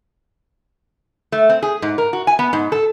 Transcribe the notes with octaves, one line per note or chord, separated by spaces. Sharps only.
A3
C4
G#4
G#2
A#4
F#4
G#5
B3
G#2
A4